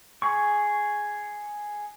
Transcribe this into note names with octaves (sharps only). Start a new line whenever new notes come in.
G#4 C#6